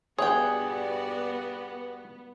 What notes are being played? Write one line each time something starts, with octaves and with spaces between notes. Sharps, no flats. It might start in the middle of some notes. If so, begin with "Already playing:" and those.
G2 B3 F#4 G#4 C#5 D5 F#5 G5